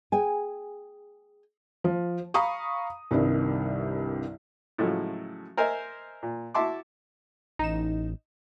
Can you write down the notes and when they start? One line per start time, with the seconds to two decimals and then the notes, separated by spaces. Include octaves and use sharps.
0.12 G#4 G5 G#5
1.84 F3
2.34 F5 A#5 B5 C#6 D#6
3.11 C2 G2 C3 D#3
4.78 A2 C#3 F3 F#3 G#3 A3
5.57 A#4 C5 D#5 E5 G#5
6.23 A#2
6.54 E4 F#4 E5 A5 C6 D6
7.59 A1 D#4 E7